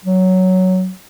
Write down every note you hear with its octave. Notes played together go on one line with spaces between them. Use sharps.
F#3